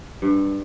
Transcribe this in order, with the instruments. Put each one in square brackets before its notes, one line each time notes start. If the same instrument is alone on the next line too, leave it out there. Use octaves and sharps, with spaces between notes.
[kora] G2